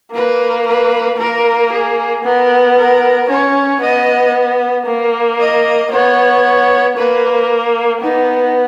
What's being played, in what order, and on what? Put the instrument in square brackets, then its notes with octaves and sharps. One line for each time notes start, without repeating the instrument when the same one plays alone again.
[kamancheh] A#3 [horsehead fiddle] B4
[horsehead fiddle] B4
[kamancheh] A#3 [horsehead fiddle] A#4
[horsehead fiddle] G#4
[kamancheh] B3 [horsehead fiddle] A#4
[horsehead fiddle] A#4
[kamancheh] C#4 [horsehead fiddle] C#5
[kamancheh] B3 [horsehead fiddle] D#5
[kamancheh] A#3
[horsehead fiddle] D#5
[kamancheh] B3 [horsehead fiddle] C#5
[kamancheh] A#3 [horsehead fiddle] B4
[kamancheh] B3 [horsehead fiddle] D#4